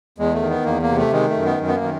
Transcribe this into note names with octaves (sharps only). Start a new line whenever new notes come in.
E2 G#3
A3
D#3
B3
E2 A#3
A#3
C3
A3
D#3 G#3
A3
F#2
B3
F#2
B3
A#3
D#3